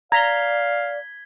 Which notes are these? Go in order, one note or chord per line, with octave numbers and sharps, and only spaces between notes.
D5 F5 A#5 G#6 B6 G7